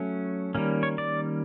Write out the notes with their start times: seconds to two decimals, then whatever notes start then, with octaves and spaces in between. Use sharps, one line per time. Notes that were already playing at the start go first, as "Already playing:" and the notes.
Already playing: F#3 A3 C#4
0.55 D#3 G3 A#3 C#4
0.83 C#5
0.98 D5